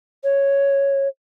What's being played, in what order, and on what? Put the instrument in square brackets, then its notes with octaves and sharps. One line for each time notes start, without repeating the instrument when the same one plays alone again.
[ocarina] C#5